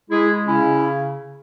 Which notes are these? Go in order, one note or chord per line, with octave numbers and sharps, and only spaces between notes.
G#3 E4 G#4
C#3 C#4 E4